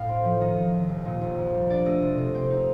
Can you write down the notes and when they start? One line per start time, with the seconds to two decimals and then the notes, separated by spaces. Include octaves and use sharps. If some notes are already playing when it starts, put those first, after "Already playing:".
Already playing: A2 F5 G5
0.08 C4
0.25 F3
0.40 D#3 D#5
0.57 D#3
0.73 D#2
0.89 F1
1.05 A#2 D#5
1.21 A#1
1.38 F2
1.54 G3
1.70 D4 D5
1.85 A3 D#5
2.02 C3
2.18 C3
2.34 C4 G5
2.50 D#4